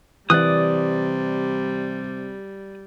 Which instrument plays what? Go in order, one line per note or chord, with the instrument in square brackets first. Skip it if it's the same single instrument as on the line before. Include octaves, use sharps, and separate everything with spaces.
[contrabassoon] C3 [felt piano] E3 F#6 [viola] G3 [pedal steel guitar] D5 D#6